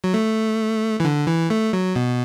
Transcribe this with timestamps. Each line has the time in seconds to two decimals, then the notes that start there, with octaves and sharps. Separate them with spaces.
0.04 F#3
0.14 A3
1.00 E3
1.05 D3
1.27 E3
1.50 A3
1.73 F#3
1.96 B2